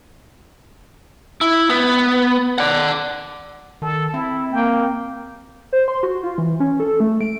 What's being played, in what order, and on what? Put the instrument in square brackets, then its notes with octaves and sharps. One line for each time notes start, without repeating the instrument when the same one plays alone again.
[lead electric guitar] E4
B3
D5 F#5
[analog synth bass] D#3 [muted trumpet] A4
[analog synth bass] C4 [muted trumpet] E4
[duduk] A#3 [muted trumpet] G5
[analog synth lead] C5
C6
F#4
F4
E3
C#4
A4
A3
D7